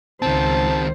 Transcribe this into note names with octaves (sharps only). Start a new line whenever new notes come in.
C#2 D#3 C4 C5 A5